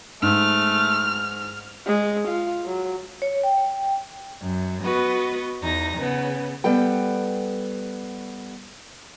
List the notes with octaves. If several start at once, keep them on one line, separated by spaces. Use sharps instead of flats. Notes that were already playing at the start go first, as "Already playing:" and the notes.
G#2 A3 F6
G#3
F4
F#3
C#5
G5
F#2
B3 F#4 B4 D#5
E2 D#4 A#6
C#3 B3
G3 B3 A4 G5